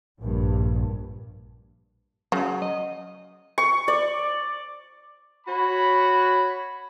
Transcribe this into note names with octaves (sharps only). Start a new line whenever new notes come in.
A#1 G2
C#3 F#3
D#5
C#6
D5
F#4 C#5 B5